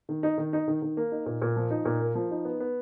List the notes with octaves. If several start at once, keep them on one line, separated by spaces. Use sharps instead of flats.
D#3
D#4
D#3
D#4
D#3
D#3
A#3
D#4
A#2
A#2
F3
D#4
A#2
A#3
F3
D#4
B3
B3